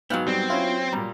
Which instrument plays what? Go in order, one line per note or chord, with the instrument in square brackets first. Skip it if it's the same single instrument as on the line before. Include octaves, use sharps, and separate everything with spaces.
[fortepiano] G#2 [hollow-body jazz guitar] F#3 B3 [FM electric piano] F5 G5
[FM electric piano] G3 [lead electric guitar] C4
[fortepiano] C#4 E4 [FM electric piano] F4
[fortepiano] A#2 G3 [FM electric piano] A#5